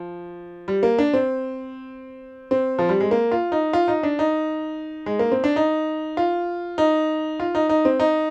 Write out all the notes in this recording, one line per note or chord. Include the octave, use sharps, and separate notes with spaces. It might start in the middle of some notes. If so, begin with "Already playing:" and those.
Already playing: F3
G3
A#3
D4
C4
C4
F3
G3
G#3
A#3
F4
D#4
F4
D#4
D4
D#4
G#3
A#3
C4
D4
D#4
F4
D#4
F4
D#4
D#4
C4
D#4